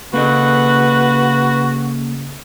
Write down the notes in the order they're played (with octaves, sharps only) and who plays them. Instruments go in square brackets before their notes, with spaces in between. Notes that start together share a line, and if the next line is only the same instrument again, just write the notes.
[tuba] C#3 [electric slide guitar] A#3 A4 D#5 [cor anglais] F#4 [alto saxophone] B4